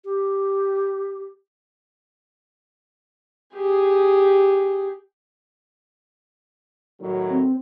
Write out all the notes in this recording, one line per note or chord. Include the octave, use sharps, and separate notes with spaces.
G4
G4 G#4
A2 D#3 F#3
C4